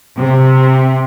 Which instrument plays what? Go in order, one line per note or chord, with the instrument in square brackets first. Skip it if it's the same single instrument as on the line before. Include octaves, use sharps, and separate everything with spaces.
[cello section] C3